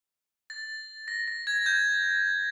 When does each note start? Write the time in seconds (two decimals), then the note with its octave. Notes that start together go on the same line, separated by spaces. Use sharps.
0.50 A6
1.08 A#6
1.28 A#6
1.47 G#6
1.66 G6